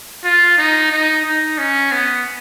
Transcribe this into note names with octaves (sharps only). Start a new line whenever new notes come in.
F4
D#4
D#4
D#4
C#4
B3